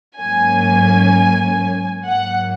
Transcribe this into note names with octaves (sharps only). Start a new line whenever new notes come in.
G#2 F#3 A#3 C#4 G#5
G#2 F#3 A#3 F#5